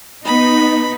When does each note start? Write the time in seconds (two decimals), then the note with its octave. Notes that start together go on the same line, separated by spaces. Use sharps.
0.25 B3 D#4 B5